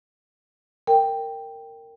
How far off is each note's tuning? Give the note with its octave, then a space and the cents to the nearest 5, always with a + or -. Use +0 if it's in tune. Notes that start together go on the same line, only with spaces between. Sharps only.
A#4 -20 G5 +0